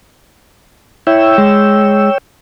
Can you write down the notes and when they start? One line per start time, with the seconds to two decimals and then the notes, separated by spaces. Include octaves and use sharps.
1.07 E4 C#5 G5 E6
1.38 G#3